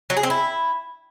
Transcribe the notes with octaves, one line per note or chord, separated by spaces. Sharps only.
F#3
G#4
C4
E4